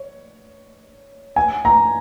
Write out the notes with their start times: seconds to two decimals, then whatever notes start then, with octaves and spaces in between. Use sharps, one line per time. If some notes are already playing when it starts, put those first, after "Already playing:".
Already playing: C#5
1.36 G#5
1.65 A#5